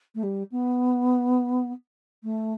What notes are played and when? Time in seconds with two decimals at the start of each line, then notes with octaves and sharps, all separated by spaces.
0.15 A3
0.23 G3
0.51 B3
2.23 A3